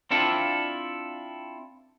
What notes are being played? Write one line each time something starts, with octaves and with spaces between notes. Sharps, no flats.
C4 D4 E4 F4 A4